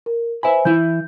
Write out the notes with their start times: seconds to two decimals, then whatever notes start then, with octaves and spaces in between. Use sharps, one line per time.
0.06 A#4
0.43 B4 C5 E5 G#5 B5
0.65 E3 E4 G6